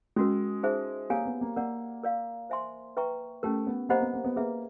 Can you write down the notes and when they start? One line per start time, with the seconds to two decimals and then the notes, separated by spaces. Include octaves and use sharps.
0.16 G#3 C#4 F#4 A#4
0.63 D#4 G#4 C5 E5
1.10 A#3 G4 A#4 C#5 F5 G#5
1.25 B3
1.41 A#3
1.56 A#3 A#4 D5 F#5
2.03 A#4 D5 F5
2.50 C5 E5 G#5 C6
2.97 B4 E5 G5 A#5 C#6
3.43 A3 C#4 E4 G4 A#4
3.67 B3
3.89 A#3 G4 C5 D#5 F#5 B5
4.01 B3
4.14 A#3
4.24 B3
4.36 A#3 G#4 B4 E5